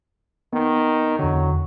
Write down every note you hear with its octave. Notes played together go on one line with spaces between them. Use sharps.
D#3 B3
E2 D3 F#3